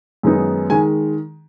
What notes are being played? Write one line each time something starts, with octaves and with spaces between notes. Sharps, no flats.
F#2 D#3 G#3 B3 D#4
D#3 G#3 G#5